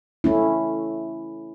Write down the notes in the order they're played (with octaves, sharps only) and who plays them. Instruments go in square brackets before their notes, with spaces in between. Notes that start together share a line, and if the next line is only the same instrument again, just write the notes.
[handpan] A3 C#4 E4